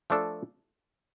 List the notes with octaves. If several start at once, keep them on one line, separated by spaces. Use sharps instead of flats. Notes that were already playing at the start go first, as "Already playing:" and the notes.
F3 A3 D4 A4